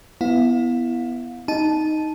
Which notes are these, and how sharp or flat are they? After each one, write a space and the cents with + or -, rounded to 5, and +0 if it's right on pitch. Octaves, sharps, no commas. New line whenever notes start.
B3 +0 E4 +10 F5 +35
D#4 +0 A5 -15